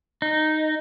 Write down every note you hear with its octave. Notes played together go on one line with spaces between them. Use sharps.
D#4